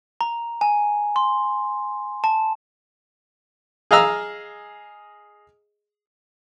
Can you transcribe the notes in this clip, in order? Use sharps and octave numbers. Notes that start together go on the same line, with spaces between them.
A#5
G#5
C6
A5
G#4 D#5 F5 A#5 E6 F6